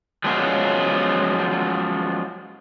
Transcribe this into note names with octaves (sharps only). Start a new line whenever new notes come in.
F3 F#3 G#3 B3 C#4 F4